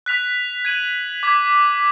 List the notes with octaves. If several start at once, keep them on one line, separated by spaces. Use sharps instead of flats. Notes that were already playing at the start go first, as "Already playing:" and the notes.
F#6 B6 F7
G#6 D#7 F#7
D6 G#6 B6